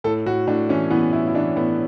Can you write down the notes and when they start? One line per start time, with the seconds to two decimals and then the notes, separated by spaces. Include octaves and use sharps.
0.04 A2 A4
0.26 A2 F#4
0.47 A2 D4
0.69 E3 C#4
0.91 E3 B3
1.13 A2 E4
1.27 E4
1.34 E3 D4
1.56 A2 B3